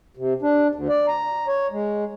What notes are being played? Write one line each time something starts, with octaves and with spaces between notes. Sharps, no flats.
C3
D4
D2
D5
A#5
C#5
G#3